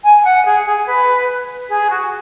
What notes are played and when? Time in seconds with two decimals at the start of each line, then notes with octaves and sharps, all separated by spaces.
0.04 G#5
0.24 F#5
0.45 G#4
0.66 G#4
0.86 B4
1.69 G#4
1.90 F#4